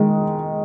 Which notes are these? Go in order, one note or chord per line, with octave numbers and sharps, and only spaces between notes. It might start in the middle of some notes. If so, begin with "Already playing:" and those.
Already playing: D#3 G#3